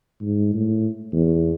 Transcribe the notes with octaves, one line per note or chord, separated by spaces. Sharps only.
G#2
A2
E2